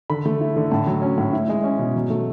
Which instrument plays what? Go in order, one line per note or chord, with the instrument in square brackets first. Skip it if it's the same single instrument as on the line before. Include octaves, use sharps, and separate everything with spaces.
[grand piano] D3 B5
A3
E4
D3
A2 A5
F#3
C#4
A2
E4
G#3
C#4
B2
F#3
A3